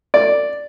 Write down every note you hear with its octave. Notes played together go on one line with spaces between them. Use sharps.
D5